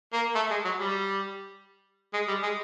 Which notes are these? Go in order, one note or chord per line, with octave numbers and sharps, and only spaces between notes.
A#3
A3
G#3
F#3
G3
G#3
G3
G#3